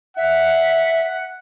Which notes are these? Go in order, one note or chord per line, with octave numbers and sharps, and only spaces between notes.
E5 F#5